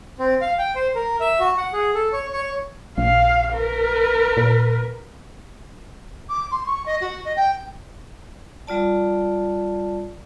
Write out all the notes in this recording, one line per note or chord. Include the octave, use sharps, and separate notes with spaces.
C4
F5
G5
C5
A#4
E5
F#4
F#5
G#4
A4
C#5
C#5
A#1 F5
A#4 B4
A#2
D6
C6
C#6
D#5
F#4
D#5
G5
G3 F4 D5 A5